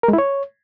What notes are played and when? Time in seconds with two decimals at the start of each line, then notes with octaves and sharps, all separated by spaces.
0.03 A#4
0.08 G#3
0.13 E4
0.18 C#5